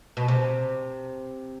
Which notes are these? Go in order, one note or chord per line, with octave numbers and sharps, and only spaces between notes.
B2
C3